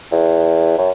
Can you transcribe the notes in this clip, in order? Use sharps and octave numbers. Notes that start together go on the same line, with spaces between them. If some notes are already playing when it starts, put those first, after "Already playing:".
E2
F#2